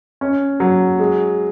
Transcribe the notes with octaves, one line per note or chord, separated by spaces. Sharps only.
C#4
F#3
G#3